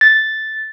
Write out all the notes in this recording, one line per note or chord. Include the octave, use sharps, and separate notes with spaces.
A6